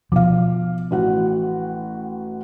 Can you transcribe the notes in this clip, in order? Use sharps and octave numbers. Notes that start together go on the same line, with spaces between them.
B2 F3 F5 D6
A1 F#4 F#5